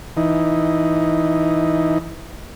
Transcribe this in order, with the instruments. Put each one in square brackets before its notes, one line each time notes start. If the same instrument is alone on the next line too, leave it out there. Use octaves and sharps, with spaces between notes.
[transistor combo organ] E3 D#4